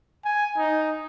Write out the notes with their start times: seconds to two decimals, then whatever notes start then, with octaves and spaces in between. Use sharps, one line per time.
0.25 G#5
0.58 D#4